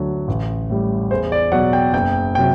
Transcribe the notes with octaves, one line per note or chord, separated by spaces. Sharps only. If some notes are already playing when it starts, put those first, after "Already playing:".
Already playing: D2 D3 F#3
A1
A2 G3
E2 C5
D5
B2 F#3 F#5
G5
F#1 G5
C3 F#3 G5